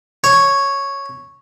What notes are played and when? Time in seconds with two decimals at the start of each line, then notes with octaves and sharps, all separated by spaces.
0.24 C#5